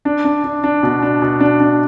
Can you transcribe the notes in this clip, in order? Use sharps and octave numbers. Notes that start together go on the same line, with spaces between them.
D4
D4
D4
D4
B2
D4
B2
D4
D4